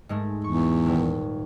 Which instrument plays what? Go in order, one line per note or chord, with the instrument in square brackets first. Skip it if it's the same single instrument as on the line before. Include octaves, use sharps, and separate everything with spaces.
[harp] G#2 G#3 A3
[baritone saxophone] E2 [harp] C#6
[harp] D#1